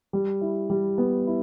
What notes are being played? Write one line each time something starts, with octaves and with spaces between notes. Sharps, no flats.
G3
E4
G3
B3
E4